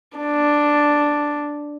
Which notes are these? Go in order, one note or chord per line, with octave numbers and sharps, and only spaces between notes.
D4